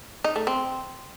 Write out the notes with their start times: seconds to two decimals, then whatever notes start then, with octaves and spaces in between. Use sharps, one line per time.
0.24 D#4
0.36 A3
0.47 C4